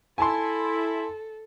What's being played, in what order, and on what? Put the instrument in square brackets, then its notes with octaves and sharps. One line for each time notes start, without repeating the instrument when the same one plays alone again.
[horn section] E4 [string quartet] A4 [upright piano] G#5 A5 C6